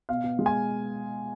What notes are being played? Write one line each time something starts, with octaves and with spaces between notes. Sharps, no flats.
B2 F5
B3
G#3
G#5